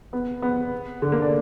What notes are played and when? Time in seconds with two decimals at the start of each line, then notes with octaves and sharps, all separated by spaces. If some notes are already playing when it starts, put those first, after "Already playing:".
0.13 B3
0.42 B3
1.02 D3
1.12 A#3
1.22 D4